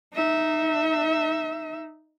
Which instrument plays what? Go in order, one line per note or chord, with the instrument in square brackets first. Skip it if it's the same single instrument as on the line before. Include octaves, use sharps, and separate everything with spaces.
[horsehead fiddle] D#4 E5